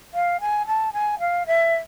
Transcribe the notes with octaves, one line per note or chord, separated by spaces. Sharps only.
F5
G#5
A5
G#5
F5
E5